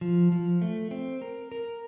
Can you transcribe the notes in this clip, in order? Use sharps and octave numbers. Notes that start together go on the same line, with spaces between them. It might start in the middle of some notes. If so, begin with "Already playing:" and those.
F3
F3
A3
C4
A#4
A#4